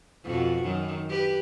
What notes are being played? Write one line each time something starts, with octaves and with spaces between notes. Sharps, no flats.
F2 B2 F#4
F#2 D#3
G4 B4